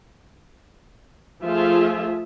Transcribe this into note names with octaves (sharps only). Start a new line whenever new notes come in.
F3 A3 F4 G#4 E5